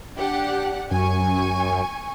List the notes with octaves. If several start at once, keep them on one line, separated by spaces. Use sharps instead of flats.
D4 G4 F#5
F#2 G#5 C#6